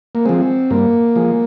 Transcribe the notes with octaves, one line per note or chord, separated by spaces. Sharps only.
A#3
F3 G#3 C4
G2 A#3
F3 G#3